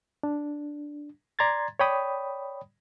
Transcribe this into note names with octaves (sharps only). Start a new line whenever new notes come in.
D4
D5 A#5 C6 G#6 A6
C#5 D5 G5 B5 D#6